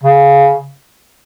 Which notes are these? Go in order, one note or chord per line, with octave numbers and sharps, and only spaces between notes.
C#3